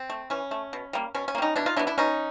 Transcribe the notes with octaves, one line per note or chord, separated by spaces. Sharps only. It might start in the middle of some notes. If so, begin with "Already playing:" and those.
Already playing: C4
A3
E3 C#4
A3
B2
G3 A#3
B2 C#4
C#4
A#3
G3 C#4 D#4
B2 D4 E4
D#4 F4
F#3 B3 D4 E4
D4 E4
B2 C#4 D#4